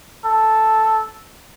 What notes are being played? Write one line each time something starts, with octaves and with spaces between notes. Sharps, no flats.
A4